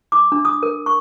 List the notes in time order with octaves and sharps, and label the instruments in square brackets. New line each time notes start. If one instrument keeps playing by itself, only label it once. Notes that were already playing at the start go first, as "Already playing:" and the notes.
[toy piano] D6
D4
D#6
A#4
C#6